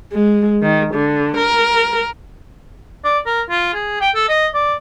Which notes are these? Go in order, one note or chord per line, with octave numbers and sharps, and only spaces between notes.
G#3
D#3
D3
A#4
D5
A#4
F4
G#4
G5
A4
D#5
D5